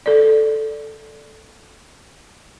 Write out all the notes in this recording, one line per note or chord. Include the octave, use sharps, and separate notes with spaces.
A4 D5